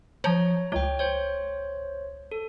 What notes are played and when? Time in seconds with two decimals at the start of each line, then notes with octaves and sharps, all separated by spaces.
0.24 F3 C#5 A#5
0.72 C#2 C#5 G5
0.99 C5 C#5
2.31 A4